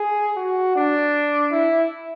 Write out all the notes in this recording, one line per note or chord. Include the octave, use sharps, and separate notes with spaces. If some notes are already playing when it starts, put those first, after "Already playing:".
Already playing: G#4
F#4
D4
E4